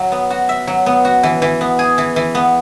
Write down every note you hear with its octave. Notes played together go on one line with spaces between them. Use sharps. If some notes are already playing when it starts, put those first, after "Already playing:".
Already playing: F#3 E5
B3
F#4
E5
F#3
B3
F#4
E3
E3
B3
G#4
E3
E3
B3